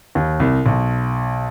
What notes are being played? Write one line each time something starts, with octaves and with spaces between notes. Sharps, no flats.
D#2
C2
B1